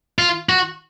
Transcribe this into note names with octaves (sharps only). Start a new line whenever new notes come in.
F4
F#4